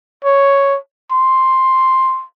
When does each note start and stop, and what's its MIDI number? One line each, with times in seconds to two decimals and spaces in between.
0.24 0.77 73
1.12 2.24 84